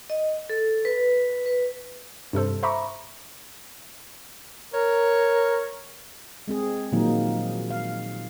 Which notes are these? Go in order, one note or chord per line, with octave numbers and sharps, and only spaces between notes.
D#5
A4
B4
B4
G2 C3 A4 C5
C5 E5 A#5 B5 C#6 D6
A#4 C#5
G#3 C4 G#4
A#2 D#3 F3 F#3 A#3 D#4
F5